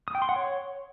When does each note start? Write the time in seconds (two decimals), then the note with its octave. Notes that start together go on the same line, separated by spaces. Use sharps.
0.08 D#6
0.15 G5
0.22 C6
0.29 F#5
0.36 C#5